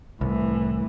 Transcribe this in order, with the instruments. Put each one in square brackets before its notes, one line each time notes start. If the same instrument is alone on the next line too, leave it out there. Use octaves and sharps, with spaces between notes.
[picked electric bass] C2 [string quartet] A2 E3